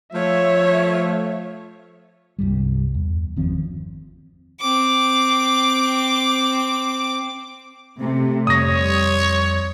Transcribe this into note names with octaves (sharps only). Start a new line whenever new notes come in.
F3 A3 C#5 E5
C2 G2 G3
E2
G1 D#3 F3 C4
C4 D6
C3 A3
F2 G3 C#5 D#6 A#6